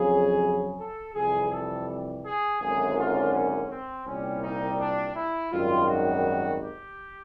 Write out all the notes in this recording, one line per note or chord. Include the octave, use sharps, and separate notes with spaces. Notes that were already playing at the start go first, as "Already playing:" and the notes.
Already playing: F2 C#3 F#3 G#4
A4
F2 C3 E3 G3 G#4
A4
G#4
G#1 F#2 D3 G#4
F4
C#4
C4
C2 A#2 G3 C#4
D#4
D4
E4
G#1 F#2 D#3 G3 F4
F#4
G4